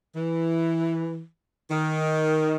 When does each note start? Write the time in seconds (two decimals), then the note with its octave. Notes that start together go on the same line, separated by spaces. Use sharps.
0.16 E3
1.71 D#3